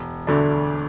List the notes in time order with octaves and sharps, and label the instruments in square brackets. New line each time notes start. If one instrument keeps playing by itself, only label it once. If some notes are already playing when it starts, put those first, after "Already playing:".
Already playing: [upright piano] E1
D2 D3 A3 D4